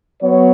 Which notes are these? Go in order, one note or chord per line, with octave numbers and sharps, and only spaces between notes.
F#3 B3 C#5